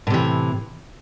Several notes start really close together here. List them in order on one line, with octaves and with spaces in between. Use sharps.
A2 C3 E3